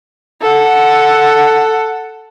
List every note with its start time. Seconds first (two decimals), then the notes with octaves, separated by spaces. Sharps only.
0.42 A4 F#5